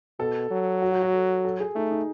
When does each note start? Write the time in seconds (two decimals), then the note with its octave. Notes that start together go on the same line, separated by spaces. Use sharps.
0.20 B2 A4
0.51 F#3
0.82 F#4
0.92 F#4
1.02 F#4
1.13 A4
1.45 A4
1.60 G#4
1.75 A3 D#4
1.91 D#4